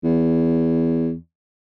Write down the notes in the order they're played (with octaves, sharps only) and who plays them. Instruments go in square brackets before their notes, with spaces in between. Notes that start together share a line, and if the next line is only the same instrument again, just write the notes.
[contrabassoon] E2